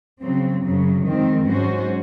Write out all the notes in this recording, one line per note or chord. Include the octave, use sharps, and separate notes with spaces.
C#3 F#3 C4
F#2 C#3 F#3
F2 D#3 G#3 C4
G#2 F#3 C#4 F#4 C5